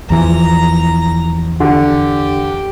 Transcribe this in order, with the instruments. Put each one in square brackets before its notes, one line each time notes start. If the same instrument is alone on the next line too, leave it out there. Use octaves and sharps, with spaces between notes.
[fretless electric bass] E2 E3 F3 [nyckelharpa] A#5
[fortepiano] D3 [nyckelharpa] G4